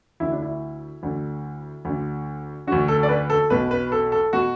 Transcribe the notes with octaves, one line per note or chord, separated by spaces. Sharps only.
D2 D3 E4
D4
E4
D2 D3
D2 D3
D2 D3 F#4
A4
D5
B4
A4
B1 B2 B4
B4
A4
A4
B2 F#4